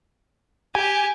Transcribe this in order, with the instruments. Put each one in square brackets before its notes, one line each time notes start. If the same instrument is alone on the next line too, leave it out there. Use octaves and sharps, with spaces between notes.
[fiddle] G4 [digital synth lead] G#5